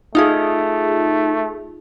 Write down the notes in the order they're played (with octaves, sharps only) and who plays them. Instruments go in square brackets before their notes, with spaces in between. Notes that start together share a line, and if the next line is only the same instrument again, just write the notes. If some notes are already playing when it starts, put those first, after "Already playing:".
[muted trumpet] A3 [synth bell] D#4 F4 G#4